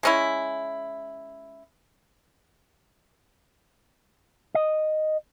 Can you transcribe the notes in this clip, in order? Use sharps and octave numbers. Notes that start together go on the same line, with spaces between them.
G#3 C#4 E4
D#5